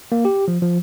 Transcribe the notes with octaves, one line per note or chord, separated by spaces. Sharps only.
A#3
G4
F3
F3